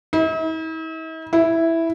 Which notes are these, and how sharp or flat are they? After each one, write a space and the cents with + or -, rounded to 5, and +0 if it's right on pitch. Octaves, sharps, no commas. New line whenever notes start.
E4 -45
E4 +0